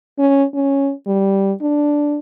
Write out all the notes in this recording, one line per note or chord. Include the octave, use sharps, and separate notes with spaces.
C#4
C#4
G3
D4